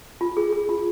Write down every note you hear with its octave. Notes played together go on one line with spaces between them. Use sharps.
F4
G#4
G#4
F4